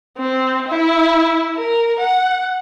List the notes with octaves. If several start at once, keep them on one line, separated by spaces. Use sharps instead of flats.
C4
E4
A#4
F#5